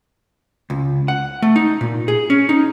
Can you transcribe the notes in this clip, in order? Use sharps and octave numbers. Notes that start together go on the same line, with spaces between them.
C#2
F#5
A3
D#4
A#2
G#4
C#4
D#4